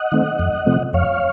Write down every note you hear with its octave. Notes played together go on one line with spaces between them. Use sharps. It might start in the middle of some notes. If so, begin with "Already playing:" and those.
Already playing: D#5 F#5
D#3 A3 C4
F2
C3 F3 A3 C4
F2 C#5 F5